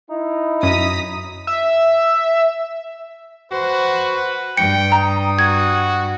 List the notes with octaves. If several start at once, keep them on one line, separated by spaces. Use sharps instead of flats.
D#4 E4
F#2 A#5 D#6 B6
E5
F#4 B4 C5
G2 G5 C#7
A#5 D#6
F#4 G#6